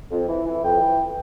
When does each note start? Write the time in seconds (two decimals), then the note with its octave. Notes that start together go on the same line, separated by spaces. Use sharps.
0.11 F2
0.29 E3
0.46 E3
0.64 F2 G5
0.81 E3